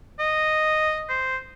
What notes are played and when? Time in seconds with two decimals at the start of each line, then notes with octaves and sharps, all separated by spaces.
0.20 D#5
1.09 C5